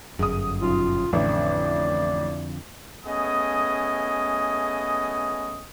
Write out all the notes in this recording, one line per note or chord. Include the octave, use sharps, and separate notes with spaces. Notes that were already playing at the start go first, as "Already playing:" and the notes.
G1 F#2 G#4 D#6
B1 C#3 F4
A1 F2 D3 D5
A3 B3 C#4 G#4 D#5 D#6